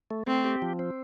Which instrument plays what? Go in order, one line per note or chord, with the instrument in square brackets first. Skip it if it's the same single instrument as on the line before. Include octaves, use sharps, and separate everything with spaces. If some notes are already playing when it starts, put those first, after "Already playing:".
[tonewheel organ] A3
[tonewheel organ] A3 [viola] C4
[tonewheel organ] G4
F3
C4